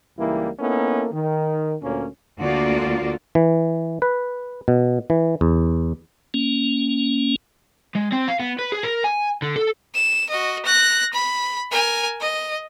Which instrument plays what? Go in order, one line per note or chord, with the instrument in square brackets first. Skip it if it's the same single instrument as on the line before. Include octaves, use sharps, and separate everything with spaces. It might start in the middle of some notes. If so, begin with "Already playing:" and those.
[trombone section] C#2 E3 G3 A#3 D#4 E4
A#3 B3 C#4 D#4 E4 A4
D#3
D2 A#2 A#3 C#4
[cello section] D2 D3 A#3 F4 F#4 D5
[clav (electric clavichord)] E3
B4
B2
E3
E2
[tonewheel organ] A#3 C#4
[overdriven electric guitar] G#3
C4
F5
B3
B4
G#4
A#4
G#5
D3
A4
[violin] E7
F#4 D#5
F#6 A#6
B5
A#4 G#5
D#5